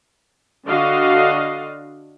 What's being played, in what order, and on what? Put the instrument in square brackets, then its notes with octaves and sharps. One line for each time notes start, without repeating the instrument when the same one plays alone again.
[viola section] D3 D4 F#4 D#5 F5